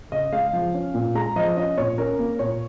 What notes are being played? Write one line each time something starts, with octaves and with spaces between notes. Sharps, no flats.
C#3 D#5
G#3 F5
F3
C#4
A#2
G#3 A#5
F3 D#5
C#4 D#5
A#2 C#5
C#4 A#4
A#3
A#2 C#5